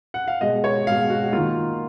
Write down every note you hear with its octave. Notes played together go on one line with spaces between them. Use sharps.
F#5
F5
B2 G#3 D#5
C#5
B2 G#3 F5
F#4
D#3 A#3 F4